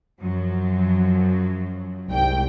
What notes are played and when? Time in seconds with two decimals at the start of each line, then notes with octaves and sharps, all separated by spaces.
0.22 F#2 F3 F#3
2.09 C2 G#2 G5